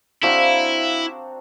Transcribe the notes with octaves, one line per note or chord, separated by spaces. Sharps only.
C4 D4 E4 F#4 F5 A#5